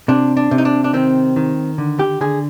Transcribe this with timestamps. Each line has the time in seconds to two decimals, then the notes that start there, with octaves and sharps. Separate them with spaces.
0.08 C3 D4
0.37 D4
0.51 C3
0.58 D#4
0.65 D4
0.84 D4
0.93 D#3 C4
1.36 D#3
1.78 D3
1.99 G4
2.21 D3 G#4